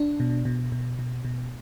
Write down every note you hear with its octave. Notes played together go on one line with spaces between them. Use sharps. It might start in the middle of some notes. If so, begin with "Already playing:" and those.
Already playing: D4
B2
B2
B2
B2
B2